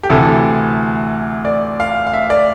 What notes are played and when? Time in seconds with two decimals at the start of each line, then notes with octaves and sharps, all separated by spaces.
0.03 G4
0.09 D2 C3 E3 A4
1.45 D5
1.80 F5
2.07 F5
2.14 E5
2.30 D5